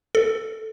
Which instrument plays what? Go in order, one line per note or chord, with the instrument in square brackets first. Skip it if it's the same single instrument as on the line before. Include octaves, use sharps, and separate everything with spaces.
[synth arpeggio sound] A4